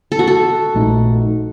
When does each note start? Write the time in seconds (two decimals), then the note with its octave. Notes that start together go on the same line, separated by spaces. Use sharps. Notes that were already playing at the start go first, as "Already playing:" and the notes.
0.12 A4
0.19 F#4
0.27 A4
0.75 A#1 A#2 A3 D#4